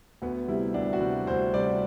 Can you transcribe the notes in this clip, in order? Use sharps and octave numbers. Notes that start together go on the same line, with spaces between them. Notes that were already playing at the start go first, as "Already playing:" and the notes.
D2 B3
C3 G3 E4
D2 D4
F#4
C3 G3
D2 C5
C3 G3 D5